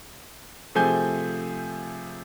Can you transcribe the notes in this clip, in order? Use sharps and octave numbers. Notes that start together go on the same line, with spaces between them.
C3 F3 A3 G#4 G#5 G6